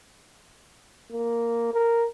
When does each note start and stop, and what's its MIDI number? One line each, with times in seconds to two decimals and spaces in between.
1.12 1.71 58
1.73 2.07 70